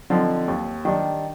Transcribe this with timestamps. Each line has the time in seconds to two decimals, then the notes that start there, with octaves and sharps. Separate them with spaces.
0.10 D3 F3 C4 D#4
0.48 D#2
0.85 D#3 G3 D4